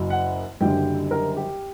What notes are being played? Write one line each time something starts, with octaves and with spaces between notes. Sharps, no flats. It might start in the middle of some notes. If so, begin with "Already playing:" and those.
Already playing: F#1 F#2 F#3
F#5
F#1 F#2 D3 G3 G5
A#4
G4